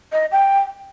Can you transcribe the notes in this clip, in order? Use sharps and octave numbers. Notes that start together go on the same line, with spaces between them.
D#5
G5